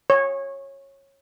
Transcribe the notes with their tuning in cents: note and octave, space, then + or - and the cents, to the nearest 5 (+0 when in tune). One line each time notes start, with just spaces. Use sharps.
C#5 -15